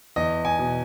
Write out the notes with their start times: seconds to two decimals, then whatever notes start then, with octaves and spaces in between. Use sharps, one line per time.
0.16 E2 D#5
0.45 G#5
0.59 B2